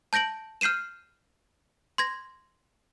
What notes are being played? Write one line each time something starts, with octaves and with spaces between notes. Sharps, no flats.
A5 G6 A#6 D7 F#7
F6 G6 C7 D#7 E7
C6 G#6 A#6